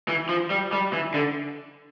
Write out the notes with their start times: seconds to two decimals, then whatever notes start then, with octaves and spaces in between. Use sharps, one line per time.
0.08 E3
0.29 F3
0.50 G3
0.73 G3
0.93 E3
1.14 D3